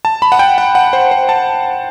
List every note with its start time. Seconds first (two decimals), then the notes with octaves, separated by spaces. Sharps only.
0.05 A5
0.22 B5
0.32 F#5
0.39 G5
0.58 F#5
0.75 F#5
0.93 C5
1.11 C5
1.29 A5